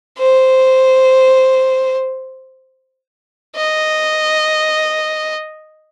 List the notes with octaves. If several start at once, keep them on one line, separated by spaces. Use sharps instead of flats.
C5
D#5